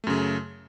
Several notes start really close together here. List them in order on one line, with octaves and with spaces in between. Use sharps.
A3 F#2 C#3